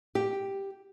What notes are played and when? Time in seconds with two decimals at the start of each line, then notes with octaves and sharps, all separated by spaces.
0.15 G4